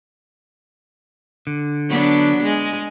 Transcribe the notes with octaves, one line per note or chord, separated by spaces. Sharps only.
D3
F#3 B3 D4
G#3